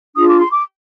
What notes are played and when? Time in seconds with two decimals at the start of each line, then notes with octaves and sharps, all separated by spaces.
0.15 D4 F4 G#4 D#6
0.27 D6
0.38 C6
0.51 D6